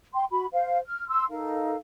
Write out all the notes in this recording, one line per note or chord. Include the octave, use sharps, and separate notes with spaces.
G5 C6
F#4 B5
C5 F5
F6
C6 E6
D#4 A4 A#4 F5